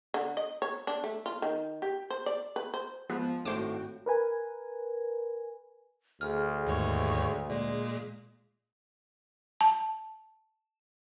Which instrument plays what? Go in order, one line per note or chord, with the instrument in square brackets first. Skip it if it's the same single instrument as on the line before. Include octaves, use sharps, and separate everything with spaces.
[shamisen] D3
D#5
C#5
D4
A3
F4
D#3
G4
C5
D5
B4
C5
[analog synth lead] F3 [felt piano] G#3 [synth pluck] B3
[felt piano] G#1 E7 [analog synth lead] A2 [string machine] F#4 G5 [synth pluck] C5 D6
[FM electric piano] A#4 B4 G#5
[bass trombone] D2 [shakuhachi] G#4 [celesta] F6
[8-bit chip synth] D#2 G#2 C#5
[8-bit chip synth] A#2 G#3 [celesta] D5
[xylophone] A5